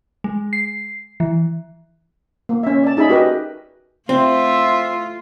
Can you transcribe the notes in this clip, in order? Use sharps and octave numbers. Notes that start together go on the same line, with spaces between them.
G#3
C7
E3
A#3
C#4 E5
D5 A5
D#4 G#4 E5 B5
F#4 G4 A#4 B4 D#5
A3 C4 F4 E5 C6